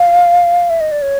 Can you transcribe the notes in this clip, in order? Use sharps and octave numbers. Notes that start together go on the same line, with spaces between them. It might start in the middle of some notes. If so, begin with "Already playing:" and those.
Already playing: F5
E5
D#5
D5
C#5